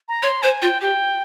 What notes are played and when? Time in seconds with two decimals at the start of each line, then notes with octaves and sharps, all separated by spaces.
0.08 A#5
0.22 C#5 C6
0.42 C5 G#5
0.62 F4 G5
0.81 G4 G5